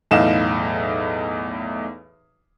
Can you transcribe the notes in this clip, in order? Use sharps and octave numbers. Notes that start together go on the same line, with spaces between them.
B1 E2 A2 D#4 F5 E7